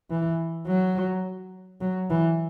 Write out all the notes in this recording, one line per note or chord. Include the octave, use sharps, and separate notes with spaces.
E3
F#3
F#3
E3